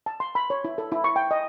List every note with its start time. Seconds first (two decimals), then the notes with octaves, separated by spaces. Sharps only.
0.06 A5
0.20 C6
0.35 B5
0.50 C#5
0.65 E4
0.78 A4
0.92 E4
1.04 C#6
1.16 G5
1.31 D#5